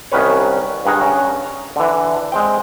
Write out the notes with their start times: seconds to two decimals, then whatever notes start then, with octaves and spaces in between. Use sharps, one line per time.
0.12 C2 D#3 C#4 B4 C#5
0.86 G2 D#3 G#4 F#5 G#5 A#5
1.01 C#4
1.44 A#5
1.76 D3 E3
2.32 G#3 C4 G5